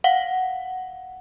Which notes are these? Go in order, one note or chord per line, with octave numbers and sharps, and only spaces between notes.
F5 F#5